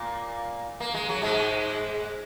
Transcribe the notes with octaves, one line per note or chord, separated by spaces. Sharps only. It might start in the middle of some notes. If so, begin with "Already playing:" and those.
Already playing: A#2 A#3
A#3
G#3
F#3
G#2 G#3